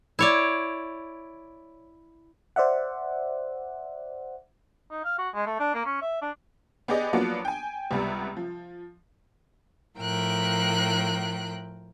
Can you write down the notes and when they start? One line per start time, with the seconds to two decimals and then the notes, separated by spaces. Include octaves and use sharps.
0.19 E4 C#5 D5
2.56 C5 D5 E5 F#5
4.91 D#4
5.05 F5
5.18 F#4
5.34 G#3
5.46 A3
5.60 D4
5.74 A#3
5.86 C#4
6.02 E5
6.22 D4
6.88 B3 G4 G#4 D5 D#5
7.13 F3 F#3 A#3 B3 D4 F#4
7.45 G5 G#5
7.91 C#2 C3 G3 B3
8.37 F3
9.97 A2 F3 A#4 G5 F#6